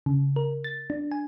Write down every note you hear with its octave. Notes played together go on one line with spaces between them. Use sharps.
C#3
A#4
A6
D4
G#5